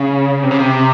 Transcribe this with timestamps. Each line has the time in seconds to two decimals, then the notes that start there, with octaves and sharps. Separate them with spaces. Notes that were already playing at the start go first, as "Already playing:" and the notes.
Already playing: C#3
0.43 C3
0.51 C#3
0.59 C3